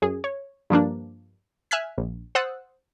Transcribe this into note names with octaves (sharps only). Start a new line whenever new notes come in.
F#2 G#4
C#5
G2 F3 A#3 D4
E5 G#5 F6 F#6 G#6 B6
A#1
C5 F#5 D#6 E6 F#6 A6